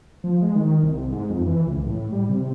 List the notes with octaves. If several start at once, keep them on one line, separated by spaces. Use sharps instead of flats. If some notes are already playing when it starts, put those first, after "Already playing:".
F3
G#3
D#3
C2
G#2
F2
E3
C#2
A2
G3
C3